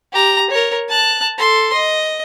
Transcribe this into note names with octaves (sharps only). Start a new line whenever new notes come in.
G4 A#5
A#4 C#5
A5 F#6
A4 C6
D#5